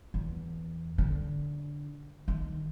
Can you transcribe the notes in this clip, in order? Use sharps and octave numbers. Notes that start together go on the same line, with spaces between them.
E2
D3
D#3